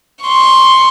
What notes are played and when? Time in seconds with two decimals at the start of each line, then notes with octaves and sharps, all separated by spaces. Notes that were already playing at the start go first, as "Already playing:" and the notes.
0.24 C6 C#6